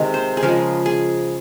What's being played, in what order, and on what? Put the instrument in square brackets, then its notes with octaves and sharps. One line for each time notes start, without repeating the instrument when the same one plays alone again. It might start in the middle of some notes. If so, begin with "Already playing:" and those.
Already playing: [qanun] C3 D#3 G#3 D#5
C5
G#4
C#3 F3 G#3 A#4
G#4